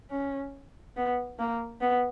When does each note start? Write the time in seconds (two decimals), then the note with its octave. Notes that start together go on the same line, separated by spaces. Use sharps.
0.10 C#4
0.96 B3
1.39 A#3
1.81 B3